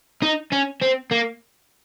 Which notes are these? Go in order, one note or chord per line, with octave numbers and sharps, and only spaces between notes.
D#4
C#4
C4
A#3